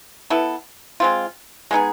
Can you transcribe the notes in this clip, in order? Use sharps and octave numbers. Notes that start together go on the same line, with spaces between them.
B3 E4 A4
G#3 C4 F4
G#3 B3 D#4 G#4